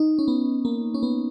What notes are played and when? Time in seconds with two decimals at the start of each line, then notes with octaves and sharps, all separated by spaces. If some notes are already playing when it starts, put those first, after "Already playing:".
Already playing: D#4
0.19 C#4
0.28 B3
0.65 A#3
0.94 C#4
1.03 B3